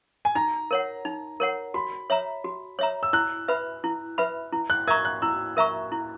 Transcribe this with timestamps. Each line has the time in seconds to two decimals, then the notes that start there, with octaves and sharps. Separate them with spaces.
0.25 G#5
0.35 D#4 A#5
0.71 A#4 C#5 F#5
1.05 D#4
1.40 A#4 C#5 F#5
1.74 F#4 B5
2.10 C#5 E5 A#5
2.44 F#4
2.79 C#5 E5 A#5
3.03 E6
3.13 E4 F#6
3.48 B4 E5 B5
3.84 E4
4.18 B4 E5 B5
4.52 E4
4.70 F#6
4.87 A#4 E5 A#5 C#6 G#6
5.05 F#6
5.22 E4 E6
5.57 A#4 E5 A#5 C#6
5.92 E4